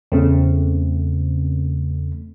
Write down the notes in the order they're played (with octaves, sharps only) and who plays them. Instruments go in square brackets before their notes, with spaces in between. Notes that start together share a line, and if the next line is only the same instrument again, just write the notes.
[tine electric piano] E2 [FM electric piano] C#3 A3 C4